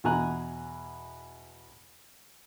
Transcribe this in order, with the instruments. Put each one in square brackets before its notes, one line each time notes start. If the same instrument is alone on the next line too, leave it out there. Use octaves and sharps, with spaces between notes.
[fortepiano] E2 B2 G#5 A#5 F#6